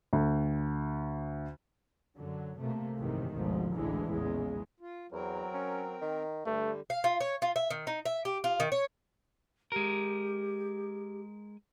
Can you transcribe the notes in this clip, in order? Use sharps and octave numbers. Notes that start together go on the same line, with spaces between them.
D2
F#2 D3 F#3
C3 A3 A#3
F#1 B1 G#2 C3 D#3 E3
G#1 D2 G#2 B2 F3
A1 D2 A2 D3 E3 G#3
A#1 E2 C#3 G#3
F4
E2 F#3 C4 A#4
C#4
D#3
G2 D3 G3 A3
F5
F4
C#5
F4
E5
D#3
D#4
E5
G4
F4
D#3
C#5
G#3 G4 A#4